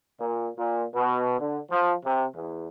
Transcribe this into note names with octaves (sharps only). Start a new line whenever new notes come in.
A#2
A#2
B2
D3
F3
C3
E2